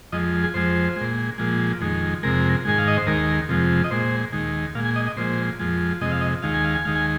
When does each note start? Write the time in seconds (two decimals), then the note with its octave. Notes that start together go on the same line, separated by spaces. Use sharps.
0.12 F2 F3 G#3 D#5
0.44 G#4
0.54 F2 F3 G#3 C5
0.96 A#2 G#3
1.38 A#2 F3 G#3
1.81 F2 D#3 G#3
2.23 F2 C3 G#3 A#4
2.65 G#2 D#3 G#3 G#5
2.78 F5
2.87 D#5
2.97 C5
3.07 D#2 D#3 G#3 A#4
3.49 F2 C3 F3 G#3
3.84 D#5
3.91 A#2 G#3 C5
4.32 D#2 D#3 G#3
4.75 A#2 F5
4.79 G#3
4.85 G#5
4.96 D#5
5.07 D#5
5.17 A#2 F3 G#3 C5
5.60 F2 F3 G#3
6.01 F2 C3 G#3 D#5
6.12 F5
6.21 D#5
6.42 D#2 D#3 G#3 F5
6.54 G#5
6.64 F5
6.75 G#5
6.85 D#2 D#3 G#3 F5
6.96 G#5